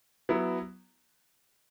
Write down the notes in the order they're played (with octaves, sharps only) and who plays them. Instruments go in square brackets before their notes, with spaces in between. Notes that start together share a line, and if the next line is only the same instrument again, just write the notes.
[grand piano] F#3 B3 E4